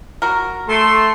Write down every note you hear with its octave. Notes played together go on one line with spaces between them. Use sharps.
F#4 A#4
A3 A5 C6